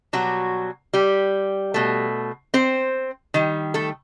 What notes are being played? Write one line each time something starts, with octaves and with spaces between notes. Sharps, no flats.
B2 F#3 G3 F#4
G3 G4
B2 A3
C4 C5
D#3 G3
A3 A4